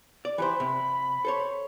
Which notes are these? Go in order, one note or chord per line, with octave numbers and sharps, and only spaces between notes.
D5
E3 G4 C5 B5
C3
A4 C5 C#5